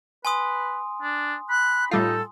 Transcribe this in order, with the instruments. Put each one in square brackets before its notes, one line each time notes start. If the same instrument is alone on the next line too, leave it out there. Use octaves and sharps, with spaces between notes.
[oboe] B4 [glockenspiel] G#5 C6 D#6
[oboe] D4
[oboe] B5 [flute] F#6
[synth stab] A2 G3 F4 [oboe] D#4 [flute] A4